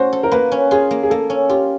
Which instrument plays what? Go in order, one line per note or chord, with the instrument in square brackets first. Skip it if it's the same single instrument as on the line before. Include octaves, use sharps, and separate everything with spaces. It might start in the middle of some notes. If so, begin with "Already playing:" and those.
Already playing: [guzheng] A3 C#4 F#4 [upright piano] C5
[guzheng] A4
[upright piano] A#4
[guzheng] A#3 [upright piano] B4
[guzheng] C#4
[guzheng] F4 [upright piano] G#4
[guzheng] A#3
[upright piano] G#4
[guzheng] A#3 [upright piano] A4
[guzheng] C#4
[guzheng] F4 [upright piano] G4